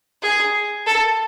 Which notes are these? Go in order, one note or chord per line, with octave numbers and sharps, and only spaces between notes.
G#4
A4